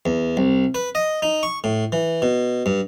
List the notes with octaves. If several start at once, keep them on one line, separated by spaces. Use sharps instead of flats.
E2
C2
B4
D#5
D#4
C#6
A2
E3
B2
G2